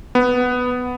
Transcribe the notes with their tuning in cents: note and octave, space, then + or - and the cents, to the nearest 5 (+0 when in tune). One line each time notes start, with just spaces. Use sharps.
B3 +5